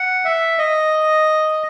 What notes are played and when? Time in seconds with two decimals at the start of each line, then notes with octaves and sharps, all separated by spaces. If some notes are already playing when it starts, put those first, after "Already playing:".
Already playing: F#5
0.25 E5
0.59 D#5